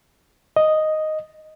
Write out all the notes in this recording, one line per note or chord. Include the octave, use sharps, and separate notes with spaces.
D#5